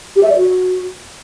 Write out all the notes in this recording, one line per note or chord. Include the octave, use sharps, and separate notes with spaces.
G4
E5
D5
F#4